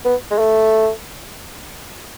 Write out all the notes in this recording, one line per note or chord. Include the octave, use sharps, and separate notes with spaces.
B3
G#3
A3